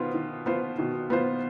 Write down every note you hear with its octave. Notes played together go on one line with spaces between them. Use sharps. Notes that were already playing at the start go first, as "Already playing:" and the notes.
Already playing: B2 D#3 B3 F4 C5
D#3
B3 F4 C5
B2 D#3
B3 F4 C5